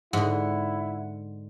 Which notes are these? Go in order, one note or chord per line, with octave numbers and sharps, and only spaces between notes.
G#2 D3 E4 F#5